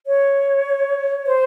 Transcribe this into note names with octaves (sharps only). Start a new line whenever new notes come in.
C#5
C5